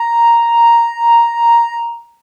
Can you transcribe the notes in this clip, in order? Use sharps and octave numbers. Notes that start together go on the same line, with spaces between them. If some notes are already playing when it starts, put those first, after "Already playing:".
Already playing: A#5